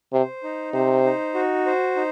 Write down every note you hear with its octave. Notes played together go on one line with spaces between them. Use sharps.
C3 C5
D#4
C3 C5
D#4
F#4
C5
D#4